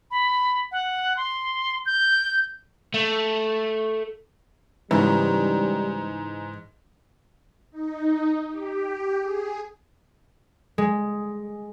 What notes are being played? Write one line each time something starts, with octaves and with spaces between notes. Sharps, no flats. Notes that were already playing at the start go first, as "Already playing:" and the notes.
B5
F#5
C6
G6
A3
G#2 C#3 E3 G3
D#4
G4
G#4
G#3